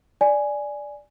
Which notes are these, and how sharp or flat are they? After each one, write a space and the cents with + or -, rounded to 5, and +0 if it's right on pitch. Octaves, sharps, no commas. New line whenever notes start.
D5 +0 G#5 +0